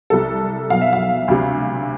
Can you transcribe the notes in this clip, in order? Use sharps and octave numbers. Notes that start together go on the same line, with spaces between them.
C2 C3 G3 A4
B1 B2 B3 F5
E5
F5
D2 C3 G3